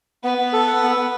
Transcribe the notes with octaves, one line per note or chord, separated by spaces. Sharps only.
B3 B4
B3
A4
F#5
B3
B3